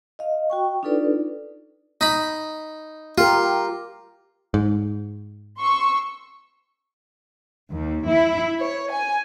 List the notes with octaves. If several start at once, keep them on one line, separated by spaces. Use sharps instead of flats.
D#5 F5
F#4 G5 C#6
D4 D#4 F4 A4 B4 D5
D#4 B5
F4 G4 A#4
G#2
C6 C#6 E6
D#2
E4
C#5
G#5